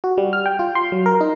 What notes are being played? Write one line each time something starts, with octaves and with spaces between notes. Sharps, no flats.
F#4
G3
F6
G5
F4
C6
F#3
A#4
D#4